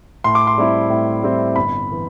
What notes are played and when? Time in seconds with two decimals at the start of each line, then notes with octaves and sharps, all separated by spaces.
0.24 A2 C6
0.35 D6
0.47 C6
0.58 G3 C4 E4
0.90 A2
1.23 G3 C4 E4
1.56 G1 B5
1.92 E3